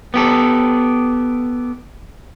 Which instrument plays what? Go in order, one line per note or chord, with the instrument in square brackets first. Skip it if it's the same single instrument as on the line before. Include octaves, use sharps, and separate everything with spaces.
[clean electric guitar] B3 G4 A4